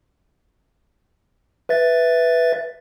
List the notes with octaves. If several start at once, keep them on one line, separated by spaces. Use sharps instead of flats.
B4 E5 A6